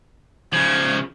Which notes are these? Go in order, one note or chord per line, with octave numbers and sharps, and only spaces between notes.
C#3 F3 G#6